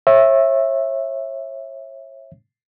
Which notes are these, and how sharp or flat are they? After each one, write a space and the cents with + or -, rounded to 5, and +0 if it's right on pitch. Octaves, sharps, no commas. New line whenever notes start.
C#5 -35 E5 +0